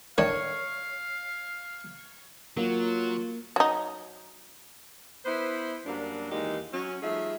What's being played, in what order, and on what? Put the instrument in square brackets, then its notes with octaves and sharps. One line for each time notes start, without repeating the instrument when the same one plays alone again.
[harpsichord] A2 D#3 D4 [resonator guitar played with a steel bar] C#5 [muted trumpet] F5
[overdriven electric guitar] F#3 [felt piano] A#3 [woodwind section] F4
[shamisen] F#3 D#4
[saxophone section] B3 E4 B4 C5
F#2 F#3 G3 A#3 D4
D#2 E3 G#3 A#3 D#4 G4
F#3 C#4
F3 G3 A3 D#4 G#4 E5